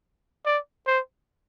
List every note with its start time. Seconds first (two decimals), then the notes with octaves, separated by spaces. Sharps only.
0.46 D5
0.87 C5